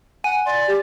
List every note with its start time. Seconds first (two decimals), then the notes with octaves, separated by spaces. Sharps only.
0.24 F#5 G#5 D#7
0.46 D5 C6
0.67 G4